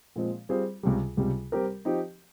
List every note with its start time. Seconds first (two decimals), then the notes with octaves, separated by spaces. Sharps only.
0.16 A#2 F3 G#3 C4
0.49 G3 C4 F4 G#4 C5
0.83 C#2 C3 G3
1.17 C#2 C3 G3
1.52 G3 C4 G4 A#4
1.85 F3 C4 D#4 G4